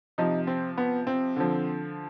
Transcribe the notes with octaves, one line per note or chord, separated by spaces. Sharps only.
C3 F3 D#4
C4
B3
C4
D3 F3